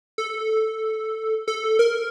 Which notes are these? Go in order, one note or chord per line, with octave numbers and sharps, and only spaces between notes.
A4
A4
A#4